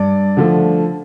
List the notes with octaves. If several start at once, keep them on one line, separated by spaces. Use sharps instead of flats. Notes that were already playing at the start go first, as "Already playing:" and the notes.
Already playing: G2 D5
D3 F3 A3